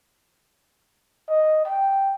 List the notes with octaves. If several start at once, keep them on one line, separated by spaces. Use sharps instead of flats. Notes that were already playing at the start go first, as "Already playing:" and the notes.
D#5
G5